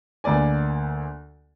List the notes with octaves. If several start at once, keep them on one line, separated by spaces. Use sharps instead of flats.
D2 A#3 D5 G#5